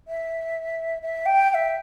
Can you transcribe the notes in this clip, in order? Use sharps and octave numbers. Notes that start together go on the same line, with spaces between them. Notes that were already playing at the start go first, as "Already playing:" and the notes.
E5
E5
G5
G5
E5